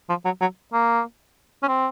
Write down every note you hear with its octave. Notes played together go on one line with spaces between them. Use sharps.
F3
F#3
F#3
A#3
C#4
C4